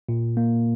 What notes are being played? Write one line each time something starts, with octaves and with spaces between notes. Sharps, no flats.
A#2
A#3